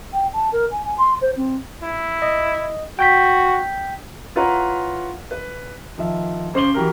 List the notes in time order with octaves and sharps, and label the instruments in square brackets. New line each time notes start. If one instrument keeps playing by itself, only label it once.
[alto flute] G5
A5
A#4
G#5
G#5
C6
C5
C4
[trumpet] E4
[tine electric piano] D#5
[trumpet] F#4 [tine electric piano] G5 G6 B6
[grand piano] E4 F4 B4 C#5 F#5 A#5
B4
D#3 F3 E5
C#3 C5 D6 C7 F#7 G7
E3 F#3 G4 A#4